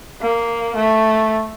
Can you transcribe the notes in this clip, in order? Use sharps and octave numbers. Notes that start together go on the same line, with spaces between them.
A#3
A3